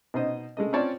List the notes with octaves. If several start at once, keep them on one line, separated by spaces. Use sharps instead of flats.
B2 D#4 C5 D#5
G#3 A3 D#5
C4 C#4 F4 C#5 D5 A5